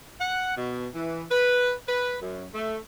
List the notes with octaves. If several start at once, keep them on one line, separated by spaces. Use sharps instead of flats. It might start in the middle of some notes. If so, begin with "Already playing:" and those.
F#5
B2
E3
B4
B4
F#2
A3